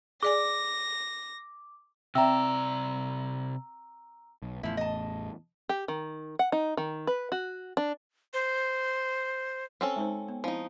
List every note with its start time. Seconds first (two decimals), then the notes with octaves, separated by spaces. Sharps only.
0.23 G#4 D5 G#5 D6 A#6
2.15 C3 C4 D5 E5 G5 A#5 E6
4.42 B1
4.63 A1 E2 A2 F3 E4
4.77 D#5 A5
5.69 G4
5.88 D#3
6.39 F#5
6.52 D#4
6.77 D#3
7.07 B4
7.32 F#4
7.77 D4
8.34 C5
9.81 C4 C#4 A4
9.96 G#3 D#4 C5
10.28 B3
10.44 F3 C4 D#4 E4 F5